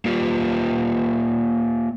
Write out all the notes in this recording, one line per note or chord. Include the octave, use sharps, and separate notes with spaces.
A#3 F4 G4